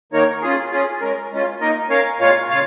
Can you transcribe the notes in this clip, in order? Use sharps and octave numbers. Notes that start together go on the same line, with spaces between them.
D#3 A#3 D#4 A#4 C#5
C#4 F4 G#4
C#4 F4 G#4
G#3 C#4 A#4
G#3 C#4 F4
A#3 D#4 A#4 D#5
C#4 A#4 C#5 F5
A#2 G#3 F4 C#5 F5
C#3 G#3 F4 C#5 F5